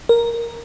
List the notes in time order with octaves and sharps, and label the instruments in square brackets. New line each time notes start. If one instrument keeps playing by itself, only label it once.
[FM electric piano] A#4